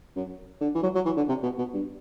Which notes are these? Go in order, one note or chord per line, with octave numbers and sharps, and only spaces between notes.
F#2
D3
E3
F#3
F#3
E3
D3
C3
B2
B2
G2